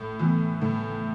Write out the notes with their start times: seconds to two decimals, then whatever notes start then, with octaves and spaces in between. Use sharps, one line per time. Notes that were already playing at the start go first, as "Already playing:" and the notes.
Already playing: A2
0.19 E3 B3
0.62 A2